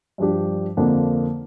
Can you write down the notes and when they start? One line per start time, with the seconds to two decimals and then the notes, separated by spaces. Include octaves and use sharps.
0.18 G2 F3 D4 G4
0.77 F2 D3 A#3 D4 F4